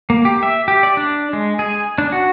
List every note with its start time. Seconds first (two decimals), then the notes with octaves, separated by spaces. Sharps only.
0.10 A#3
0.25 G4
0.43 E5
0.68 G4
0.83 D5
0.97 D4
1.33 G#3
1.59 G#4
1.98 D4
2.12 F#4